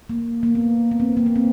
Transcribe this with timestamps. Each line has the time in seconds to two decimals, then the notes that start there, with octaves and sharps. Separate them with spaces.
0.10 A#3
0.43 A#3
0.55 B3
0.91 B3
1.00 C4
1.17 A#3
1.26 B3
1.36 C4